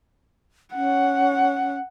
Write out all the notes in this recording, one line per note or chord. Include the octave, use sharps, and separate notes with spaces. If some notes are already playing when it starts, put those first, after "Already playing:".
C#4 F#5